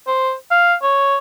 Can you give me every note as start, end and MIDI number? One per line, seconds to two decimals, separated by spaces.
0.07 0.33 72
0.51 0.74 77
0.83 1.18 73